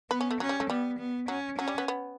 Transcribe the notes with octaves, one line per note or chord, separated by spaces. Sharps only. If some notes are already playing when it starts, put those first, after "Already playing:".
B3 B4
C#4
A3
F#3 C#4
G3
A3
G3 B3
B3
F#3 C#4
F#3 C#4
G3
B3
B3